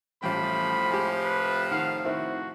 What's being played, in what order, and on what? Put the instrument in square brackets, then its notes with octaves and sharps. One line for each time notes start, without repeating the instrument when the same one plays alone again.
[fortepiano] A1 G3 G5 [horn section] A2 C3 F3 [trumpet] B5
[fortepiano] G#3 G4
[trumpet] B4
[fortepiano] D#3 F#5 [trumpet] F5
[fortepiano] D#3 C4 E4 [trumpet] F#4